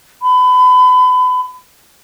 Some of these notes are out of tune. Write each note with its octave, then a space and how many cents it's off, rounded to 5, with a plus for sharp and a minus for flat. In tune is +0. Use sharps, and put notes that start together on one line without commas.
B5 +30